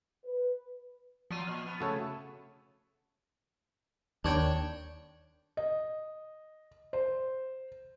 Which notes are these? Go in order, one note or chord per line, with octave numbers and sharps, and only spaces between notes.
B4
F3 F#3 F4 D#7
A#2 F6
B3
C#3 A3 F#4 A4 C#5
D#2 D4 C#5 G5
D#5
C5